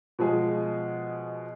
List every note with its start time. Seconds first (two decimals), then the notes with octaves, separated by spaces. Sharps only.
0.19 B2 F3 G#3 G#4